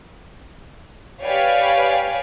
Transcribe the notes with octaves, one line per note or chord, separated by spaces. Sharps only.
G4 B4 C#5 D5 F5 G#5